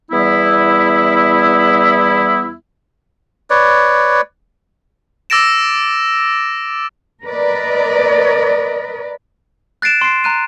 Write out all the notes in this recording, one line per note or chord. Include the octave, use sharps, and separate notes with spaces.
E2 G3 B3 E4
B4 C#5 D5
D6 E6 A6 A#6 D7 E7
A#4 B4 D5 D#5
F#6 A6 C7 D7 E7
C6 C7
A#5 F#6 D#7